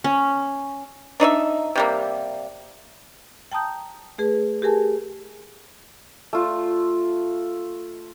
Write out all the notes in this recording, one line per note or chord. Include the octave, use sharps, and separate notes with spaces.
C#4
D4 D#4 D5 E5
C3 G3 A#3
G5 A5 A#5 D#6 G6
A3 G#4 B4
G4 G#4 A#4 G#5 A5
A3 F4